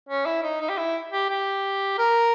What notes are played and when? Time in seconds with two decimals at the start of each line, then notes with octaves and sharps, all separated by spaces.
0.09 C#4
0.26 E4
0.43 D#4
0.61 D#4
0.70 G4
0.78 E4
1.12 G4
1.30 G4
1.98 A#4